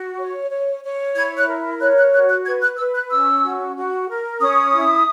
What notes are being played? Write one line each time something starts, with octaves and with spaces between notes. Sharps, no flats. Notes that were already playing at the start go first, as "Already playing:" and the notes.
Already playing: F#4
C#5
C#5
C#5
E4 G#6
F#6
A#4
C#5 F#6
F#6
F#4 F#6
F#6
B4 G#6
F#6
B4 E6
F#6
C#4 E6
F#4
F#4
A#4
C#4 D#6
E4